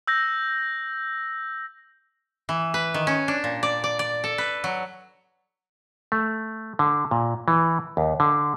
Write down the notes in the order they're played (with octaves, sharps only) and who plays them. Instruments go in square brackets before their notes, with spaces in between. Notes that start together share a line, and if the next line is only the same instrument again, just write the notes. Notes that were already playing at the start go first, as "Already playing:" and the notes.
[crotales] E6 G6 A#6
[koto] E3
B4
D#3
C#4
D4
A#2
D5
D5
D5
A4
B4
F#3
[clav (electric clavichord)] A3
D3
A#2
E3
D#2
D3